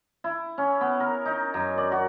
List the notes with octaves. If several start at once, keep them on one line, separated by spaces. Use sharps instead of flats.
E4
C#4
B3
A#4
D#4
F#2
D5
F#4